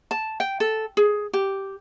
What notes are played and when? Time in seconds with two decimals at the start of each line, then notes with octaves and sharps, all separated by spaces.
0.11 A5
0.40 G5
0.60 A4
0.97 G#4
1.33 G4